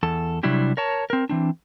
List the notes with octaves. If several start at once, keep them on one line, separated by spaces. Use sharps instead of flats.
E2 A4
C3 F#3 G3 D4 E4 G4
A#4 C#5 A5
C4 A#4
E3 C4 D4